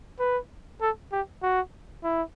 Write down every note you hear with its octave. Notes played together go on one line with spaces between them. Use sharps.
B4
A4
G4
F#4
E4